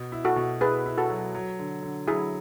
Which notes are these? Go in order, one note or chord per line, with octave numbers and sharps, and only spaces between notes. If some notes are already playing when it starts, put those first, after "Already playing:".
Already playing: B2
E4
F#4 A4
B2
E4 G#4 B4
E4
F#4 A4
F#3
F#3
D3
D3
F#3 E4 G#4